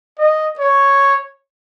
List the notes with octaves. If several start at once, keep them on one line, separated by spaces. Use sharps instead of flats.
D#5
C#5